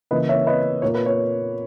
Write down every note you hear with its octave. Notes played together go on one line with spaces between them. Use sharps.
C#3 E3 A#3 B4 D#5
C#5 E5
B4 D#5
A#2 A#3 C#5
B4
C#5